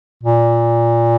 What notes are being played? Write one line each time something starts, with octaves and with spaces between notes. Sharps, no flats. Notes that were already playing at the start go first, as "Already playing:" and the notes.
A#2